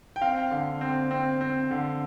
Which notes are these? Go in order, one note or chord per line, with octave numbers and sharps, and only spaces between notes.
G5
C4 F5
D3
C4
C4
C4
D3